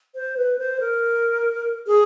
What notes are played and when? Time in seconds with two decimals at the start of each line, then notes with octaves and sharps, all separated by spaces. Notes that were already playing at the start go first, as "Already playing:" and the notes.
0.15 C5
0.37 B4
0.59 C5
0.80 A#4
1.87 G#4